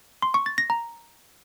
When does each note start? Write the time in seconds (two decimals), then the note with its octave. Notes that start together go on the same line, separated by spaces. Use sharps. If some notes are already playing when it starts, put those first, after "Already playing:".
0.22 C6
0.34 C#6
0.46 A6
0.58 A#6
0.70 A#5